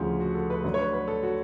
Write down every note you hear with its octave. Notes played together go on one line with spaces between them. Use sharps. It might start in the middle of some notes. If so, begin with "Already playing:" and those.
Already playing: D2 C#3 F3
F#4
A4
B4
D2 D3 F#3
C#5
B4
B4
A4
F#4